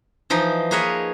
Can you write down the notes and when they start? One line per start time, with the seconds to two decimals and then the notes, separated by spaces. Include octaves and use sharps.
0.30 E3 F3 D#4
0.71 A#3 G#4 B4 C#5 D#5